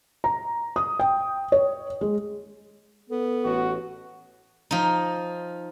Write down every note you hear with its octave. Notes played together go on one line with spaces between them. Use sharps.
A#5
D#6
G5
C#5
G#3
B3 A4
A1 F#4
F3 D#4